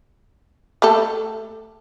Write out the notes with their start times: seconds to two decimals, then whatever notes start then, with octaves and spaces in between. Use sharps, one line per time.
0.82 A3 G4 A4